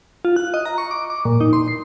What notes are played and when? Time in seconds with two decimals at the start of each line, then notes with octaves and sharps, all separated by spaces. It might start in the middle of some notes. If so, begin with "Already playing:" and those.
0.25 F4
0.36 F#6
0.54 D#5
0.66 A#5
0.78 C#6
0.91 D6
1.10 D6
1.25 A#2
1.41 D#4
1.53 C6
1.68 C7